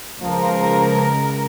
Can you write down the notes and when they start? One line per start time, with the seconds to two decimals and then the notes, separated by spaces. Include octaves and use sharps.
0.22 C#2 F3 A#4